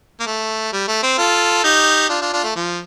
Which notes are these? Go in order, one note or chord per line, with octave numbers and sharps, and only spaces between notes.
A#3
A3
G3
A3
C4
F4 A4
D#4 G4
D4 F4
D4 F4
D4 F4
A3
F3